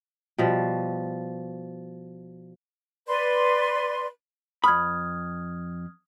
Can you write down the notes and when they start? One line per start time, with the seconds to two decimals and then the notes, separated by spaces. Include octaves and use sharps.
0.38 B2 F3 G3
3.07 B4 D5 C6
4.64 F2 B5 D#6 F6 G#6